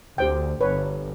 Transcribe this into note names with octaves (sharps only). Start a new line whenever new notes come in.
D2 G4 C5 G5
G1 B4 C#5